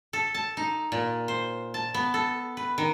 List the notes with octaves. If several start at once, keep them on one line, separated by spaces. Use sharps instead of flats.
A4
A5
D#4
A#2
C5
A5
B3
A4
B4
D#3